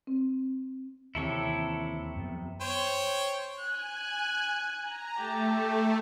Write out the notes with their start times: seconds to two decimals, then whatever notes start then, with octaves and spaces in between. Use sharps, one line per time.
0.07 C4
1.15 D#2 C3 E3 E4 A4 C#5 A#5
2.16 F#2 F3 B3
2.61 C5 C#5 G5
3.60 G#5 F#6
4.81 A#5
5.17 A3 G4 A5